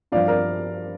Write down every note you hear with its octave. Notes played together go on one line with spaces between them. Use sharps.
G2 F3 C4 D5 F5
A#4 D5